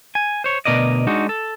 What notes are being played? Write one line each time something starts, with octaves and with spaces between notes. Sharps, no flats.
G#5
C5 C#5
D2 B2 A#4 D5 D#5
G#3 D4 D#4 F#4
A4